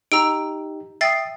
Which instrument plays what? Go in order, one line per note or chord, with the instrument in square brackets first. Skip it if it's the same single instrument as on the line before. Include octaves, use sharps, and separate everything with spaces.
[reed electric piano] D#4 G4 [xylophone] A#5 E6 D7
[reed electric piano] E5 D#6 [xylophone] G5 A6 C7